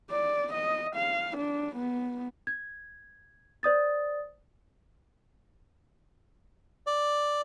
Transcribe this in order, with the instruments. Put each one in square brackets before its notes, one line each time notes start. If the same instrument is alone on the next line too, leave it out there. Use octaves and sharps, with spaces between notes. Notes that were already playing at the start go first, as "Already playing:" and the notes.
[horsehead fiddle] D5
D#5
F5
D4
B3
[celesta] G#6
C5 D5 D#6 A6
[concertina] D5